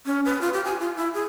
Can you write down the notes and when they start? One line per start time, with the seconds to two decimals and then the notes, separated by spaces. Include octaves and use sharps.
0.06 C#4
0.25 B4
0.41 F4
0.53 G4
0.65 G#5
0.80 F4
0.96 E4
1.14 G#4